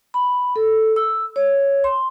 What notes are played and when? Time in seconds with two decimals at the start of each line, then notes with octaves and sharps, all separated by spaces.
0.14 B5
0.56 A4
0.96 E6
1.36 C#5
1.84 C6